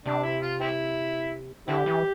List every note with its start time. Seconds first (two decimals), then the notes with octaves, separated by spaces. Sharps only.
0.06 C3 D4
0.23 E4
0.42 F4
0.60 C4 E4
1.68 D3 C4 E4 G4
1.86 E3